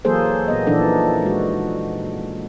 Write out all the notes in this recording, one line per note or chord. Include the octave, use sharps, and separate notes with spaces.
E3 F#3 A#3 G#4 A4 C5
A#2 B3 D#5
A#2 E3 F3 D4 D#4 A4
G#3 F#4